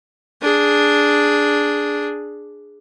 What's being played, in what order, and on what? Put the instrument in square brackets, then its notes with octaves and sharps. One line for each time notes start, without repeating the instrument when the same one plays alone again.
[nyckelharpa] D4 G#4